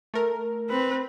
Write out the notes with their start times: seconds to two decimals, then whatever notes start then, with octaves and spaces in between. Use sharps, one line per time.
0.14 A3 A#4
0.69 C4 B4